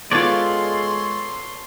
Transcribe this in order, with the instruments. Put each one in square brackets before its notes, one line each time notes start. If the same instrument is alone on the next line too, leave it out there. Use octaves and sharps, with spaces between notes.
[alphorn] G#3 [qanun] B3 F4 [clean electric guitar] A4 C#5 D5 [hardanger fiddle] C6